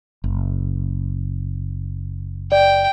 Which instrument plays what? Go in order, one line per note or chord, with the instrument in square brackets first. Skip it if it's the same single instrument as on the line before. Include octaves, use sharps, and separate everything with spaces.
[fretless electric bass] F#1
[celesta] D5 [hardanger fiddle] G5